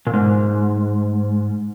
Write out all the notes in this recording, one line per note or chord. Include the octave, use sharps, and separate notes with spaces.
A#2
G#2